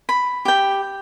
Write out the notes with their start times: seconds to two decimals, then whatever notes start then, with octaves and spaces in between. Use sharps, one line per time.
0.09 B5
0.45 G4 G5